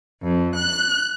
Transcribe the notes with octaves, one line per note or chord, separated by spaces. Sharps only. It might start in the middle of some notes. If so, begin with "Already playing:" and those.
F2
F#6